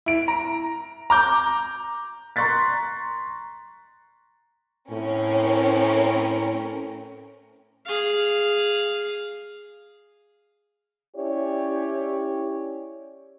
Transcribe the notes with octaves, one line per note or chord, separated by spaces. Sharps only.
E4 D7
A#5
A#5 D6 G6
A#5 C6 C#6 F#6 A6 B6
A2 C4 C#4 A#4
G#4 F5
C#4 E4 G4 C#5 D5